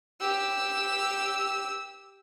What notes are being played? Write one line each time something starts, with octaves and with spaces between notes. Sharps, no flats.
G4 E6